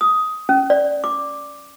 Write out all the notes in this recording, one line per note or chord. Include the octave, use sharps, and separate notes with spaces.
D#6
C#4
D5
D6